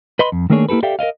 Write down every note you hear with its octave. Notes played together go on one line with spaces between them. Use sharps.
B4 D#5 B5 C6
F2
D#3 A3 A#3 D4 G#4 C#5
A#3 E4 G4 A4 B4
G4 A4 D5 E5 F5 G5
A#4 D5 D#5 F5